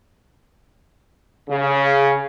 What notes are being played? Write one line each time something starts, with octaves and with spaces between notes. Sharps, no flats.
C#3